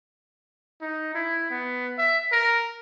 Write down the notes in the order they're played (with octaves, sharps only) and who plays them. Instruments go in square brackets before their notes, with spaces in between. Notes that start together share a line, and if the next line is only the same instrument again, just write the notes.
[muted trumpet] D#4
E4
B3
E5
A#4